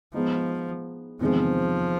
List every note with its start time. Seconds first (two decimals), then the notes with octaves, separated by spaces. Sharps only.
0.14 F3 G#3 B3 D#4
1.21 E2 C3 D#3 F3 G#3 C4